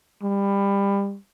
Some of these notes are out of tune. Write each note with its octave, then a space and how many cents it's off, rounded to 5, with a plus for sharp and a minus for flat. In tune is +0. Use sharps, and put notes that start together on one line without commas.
G3 +25